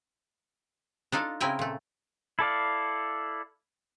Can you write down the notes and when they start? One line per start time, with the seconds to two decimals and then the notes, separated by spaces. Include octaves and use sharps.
1.12 D4 D#4 F4 A4
1.40 C#3 C4 E4 A#4 G5 G#5
1.59 A#2 A3
2.39 E4 A4 D5 F5